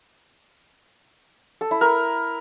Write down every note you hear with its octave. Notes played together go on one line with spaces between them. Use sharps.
A4
E4
A#4